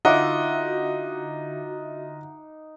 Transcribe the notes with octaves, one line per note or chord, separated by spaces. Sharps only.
D3 D#4 F4 F#4 D#5 E5 F#5 D6